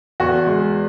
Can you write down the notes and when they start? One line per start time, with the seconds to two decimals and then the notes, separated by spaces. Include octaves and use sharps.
0.20 E2 F#4
0.47 G#3